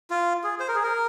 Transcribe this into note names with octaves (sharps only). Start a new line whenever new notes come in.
F4
G#4
C5
A#4
G#4
A#4